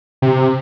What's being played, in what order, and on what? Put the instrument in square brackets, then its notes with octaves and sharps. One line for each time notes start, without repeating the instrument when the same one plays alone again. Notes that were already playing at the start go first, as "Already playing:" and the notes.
[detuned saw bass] C3